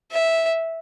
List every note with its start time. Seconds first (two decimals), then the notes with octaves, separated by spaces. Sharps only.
0.11 E5